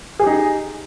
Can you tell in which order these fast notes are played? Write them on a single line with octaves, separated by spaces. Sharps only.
G#4 G4 D#4